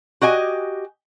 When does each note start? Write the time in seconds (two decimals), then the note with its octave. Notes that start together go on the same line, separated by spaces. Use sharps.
0.21 F#4 G4 D#5 G#5